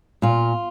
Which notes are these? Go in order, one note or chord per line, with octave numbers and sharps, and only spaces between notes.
A#2 F4